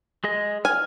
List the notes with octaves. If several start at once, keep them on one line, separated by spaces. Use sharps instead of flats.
G#3 G#4 D#5
G#5 F6